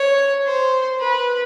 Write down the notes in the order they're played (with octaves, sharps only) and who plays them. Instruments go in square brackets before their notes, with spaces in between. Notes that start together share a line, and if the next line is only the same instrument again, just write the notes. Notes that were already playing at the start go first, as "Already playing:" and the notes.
Already playing: [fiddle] C#5
C5
B4